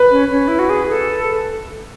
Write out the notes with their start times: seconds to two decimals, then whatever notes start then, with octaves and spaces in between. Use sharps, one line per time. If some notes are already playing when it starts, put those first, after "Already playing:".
Already playing: B4
0.11 C#4
0.31 C#4
0.48 E4
0.59 F#4
0.70 G#4
0.90 A4